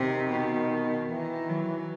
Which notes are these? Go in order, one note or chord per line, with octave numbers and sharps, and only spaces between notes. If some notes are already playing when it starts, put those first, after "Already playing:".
Already playing: C3 D#3
B2
D#3 E3
F#3